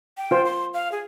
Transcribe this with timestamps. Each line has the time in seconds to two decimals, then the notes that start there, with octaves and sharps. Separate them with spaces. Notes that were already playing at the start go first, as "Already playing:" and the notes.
0.17 G5
0.31 F4 C5
0.45 C6
0.74 F5
0.92 G#4